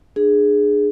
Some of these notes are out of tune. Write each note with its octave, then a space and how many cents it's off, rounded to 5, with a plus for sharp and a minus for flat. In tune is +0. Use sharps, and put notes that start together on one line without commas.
D4 +25 G#4 +0